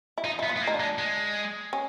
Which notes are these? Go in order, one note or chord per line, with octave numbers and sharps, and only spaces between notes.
E4
D#4 F4
B3 E4
F4
B3
A#3
D#4
D4
G#3
G#3
C#4